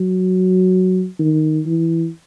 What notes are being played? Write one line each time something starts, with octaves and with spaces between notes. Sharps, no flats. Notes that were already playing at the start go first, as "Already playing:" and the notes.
Already playing: F#3
D#3
E3